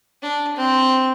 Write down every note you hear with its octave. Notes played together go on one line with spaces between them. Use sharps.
D4
C4